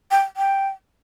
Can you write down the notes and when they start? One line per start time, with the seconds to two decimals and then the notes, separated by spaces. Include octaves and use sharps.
0.11 G5
0.37 G5